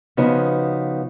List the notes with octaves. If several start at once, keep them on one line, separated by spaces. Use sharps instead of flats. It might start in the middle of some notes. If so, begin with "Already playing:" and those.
C#3 F3 B3 D#4 F#4